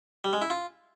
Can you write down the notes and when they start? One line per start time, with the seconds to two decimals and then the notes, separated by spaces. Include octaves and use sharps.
0.24 G3
0.33 G#3
0.42 E4
0.50 F4